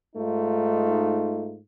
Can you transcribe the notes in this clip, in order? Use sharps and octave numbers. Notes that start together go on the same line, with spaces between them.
G#2 A3 D#4 F4